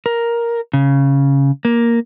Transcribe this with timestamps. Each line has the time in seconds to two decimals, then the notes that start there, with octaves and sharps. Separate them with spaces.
0.06 A#4
0.73 C#3
1.65 A#3